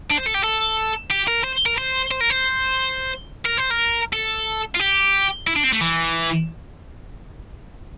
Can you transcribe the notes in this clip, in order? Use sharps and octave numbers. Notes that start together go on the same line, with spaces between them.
D4
C5
A4
G4
A4
G4
A#4
C5
A#4
C5
C5
A#4
C5
A#4
C5
A#4
A4
F4
G4
E4
D4
C4
A3
E3